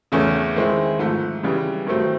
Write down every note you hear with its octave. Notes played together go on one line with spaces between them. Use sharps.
E2 C#3 E3 A3 C#4
D#3 G#3 C4 E4
G#2 F3 A3
C#3 E3 G3
G2 D#3 F#3 A3 C4